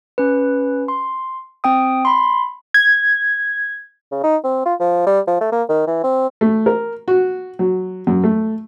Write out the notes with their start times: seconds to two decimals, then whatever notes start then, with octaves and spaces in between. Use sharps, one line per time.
0.18 C#4 B4
0.88 C6
1.64 C4 G5 D#6
2.05 B5 C6
2.74 G#6
4.12 C#3
4.23 D#4
4.44 C4
4.66 F4
4.80 F3
5.07 G3
5.28 F3
5.41 A3
5.52 A#3
5.69 D#3
5.87 E3
6.04 C4
6.41 A3
6.66 A#4
7.08 F#4
7.59 F#3
8.07 F#2
8.24 A3